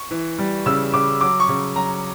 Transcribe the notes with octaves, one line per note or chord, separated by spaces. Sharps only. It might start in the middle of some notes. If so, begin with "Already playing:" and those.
Already playing: C#6
E3
G3
C#3 E6
C#3 D6
F#3 D6
C#6
C#3
F#3 A#5